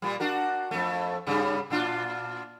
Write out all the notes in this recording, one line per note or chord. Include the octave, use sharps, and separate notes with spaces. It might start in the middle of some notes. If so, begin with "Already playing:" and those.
A#2 G3
D4 F#4 A#4
F2 A3
G2 C#3 G3
A#2 D4 F4